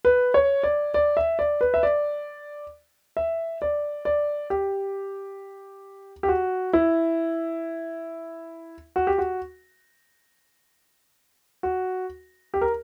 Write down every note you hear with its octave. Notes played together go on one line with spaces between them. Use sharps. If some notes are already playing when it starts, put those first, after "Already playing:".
B4
C#5
D5
D5
E5
D5
B4
E5
D5
E5
D5
D5
G4
G4
F#4
E4
F#4
G4
F#4
F#4
G4
A#4